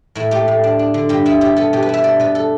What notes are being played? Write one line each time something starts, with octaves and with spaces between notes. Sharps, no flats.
A2 E4
A3 G4
A2
D4
D4
D3
G2 G4
B3 E4
B2 G4
B3 A4
B2 G4
B4
E4 E5
D4 D5
B2 B4
A4